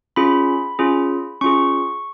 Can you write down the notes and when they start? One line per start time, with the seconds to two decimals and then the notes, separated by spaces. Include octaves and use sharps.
0.16 C#4 F4 G#4 B5
0.79 C#4 F4 G#4
1.41 C#4 F4 G#4 C#6